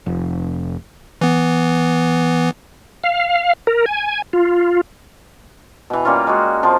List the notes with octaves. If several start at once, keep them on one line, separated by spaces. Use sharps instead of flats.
F1
E3 B3
F5
A#4
G#5
F4
B2 E3
G3 A#3 C#4 F4
G#3 F#4
C3 F3